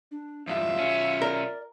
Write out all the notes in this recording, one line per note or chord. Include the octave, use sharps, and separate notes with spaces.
D4
E2 G2 F4 E5 F5
B1 C#4
A#4 D5